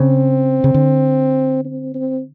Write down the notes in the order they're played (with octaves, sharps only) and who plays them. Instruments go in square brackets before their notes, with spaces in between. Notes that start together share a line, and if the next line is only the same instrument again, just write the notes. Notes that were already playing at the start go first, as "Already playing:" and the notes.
Already playing: [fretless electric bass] C#3 [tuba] C4
[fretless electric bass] C#3
D3
[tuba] C4
C4